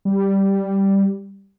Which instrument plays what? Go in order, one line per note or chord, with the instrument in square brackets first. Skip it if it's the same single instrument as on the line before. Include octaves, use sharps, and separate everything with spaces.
[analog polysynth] G3